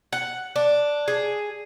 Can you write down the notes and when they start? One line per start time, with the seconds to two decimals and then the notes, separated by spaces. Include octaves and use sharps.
0.13 F#5
0.56 D4
1.08 G#4